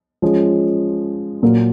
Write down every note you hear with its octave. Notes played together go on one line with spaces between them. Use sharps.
F3 G#3 C#4
A#2 F#3 A#3